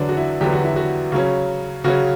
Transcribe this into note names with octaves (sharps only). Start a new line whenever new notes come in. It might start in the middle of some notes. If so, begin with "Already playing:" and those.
Already playing: E2 D3 F#3 B3 C#4 D4
F#4
E4
E2 D3 F#3 B3 G4
F#4
E4
F#4
C#3 F#3 C#4
C#3 F#3 C#4 F#4